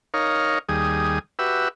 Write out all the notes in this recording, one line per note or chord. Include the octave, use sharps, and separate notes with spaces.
D#4 A#4 C#5 F5
D#2 G3 G#4 D#6
F#4 G4 B4 E5 E6